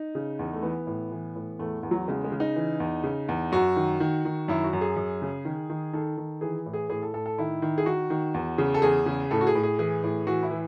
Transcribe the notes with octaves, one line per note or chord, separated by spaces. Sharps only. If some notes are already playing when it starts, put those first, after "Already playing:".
Already playing: D#4
C#3
E2
A3
E3 B3
A2
E3
A2
E2 A3
E2
F#3
C#3 G#3
G#3
C#3
D#4
E3
E2
C#3
E2
F#2 F#4
D#3
D#3
D#3
F#2 E4
F#4
F#2
G#4
F#2
C#3
D#3
D#3
D#3 A4
D#3
E3 G#4
A2
G#4
A2 G#4
A4
A2 A4
A4
D#3 E4
D#3
G#4
D#3 F#4
D#3
E2
C#3
A4
E2 G#4
C#3
A2 A4
F#4
G#4
A2
G#4
E3 G#4
A2
E3 F#4
E4
E3